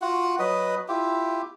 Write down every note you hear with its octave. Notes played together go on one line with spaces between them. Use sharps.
F4 F#4 F#5
F#3 B4 D#5
E4 F4 G4